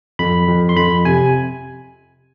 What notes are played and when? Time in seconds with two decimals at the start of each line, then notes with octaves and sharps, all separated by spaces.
0.19 F2 B5
0.48 F2
0.69 C6
0.77 F2 B5
1.05 C3 G#5